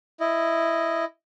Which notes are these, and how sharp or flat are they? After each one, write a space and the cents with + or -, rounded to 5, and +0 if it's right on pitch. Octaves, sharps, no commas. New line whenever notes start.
E4 +5 D#5 +0